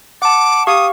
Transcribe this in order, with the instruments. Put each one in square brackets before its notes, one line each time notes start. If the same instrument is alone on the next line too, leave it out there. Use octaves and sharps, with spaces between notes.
[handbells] F#5 A5 [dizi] D6
[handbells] G4 F5 C#6 [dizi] D#6